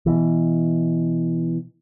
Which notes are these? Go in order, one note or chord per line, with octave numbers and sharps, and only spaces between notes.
B2 E3